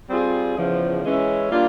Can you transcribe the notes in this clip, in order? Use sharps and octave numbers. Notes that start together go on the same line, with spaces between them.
G3 C4 F4 G#4
E2 C#3 F3
E3 G#3 C#4 E4
G3 A#3 D4 F4